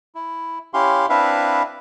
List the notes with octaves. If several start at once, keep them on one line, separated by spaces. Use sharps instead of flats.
E4
C#4 E4 G4 F5 C6
C4 D4 E4 B4 E5 F5